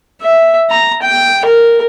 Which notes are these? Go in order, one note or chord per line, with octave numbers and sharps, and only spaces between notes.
E5
A#5
G5
A#4